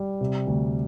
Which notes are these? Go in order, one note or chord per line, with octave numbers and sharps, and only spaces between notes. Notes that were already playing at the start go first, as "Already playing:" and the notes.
Already playing: G3
C3
D2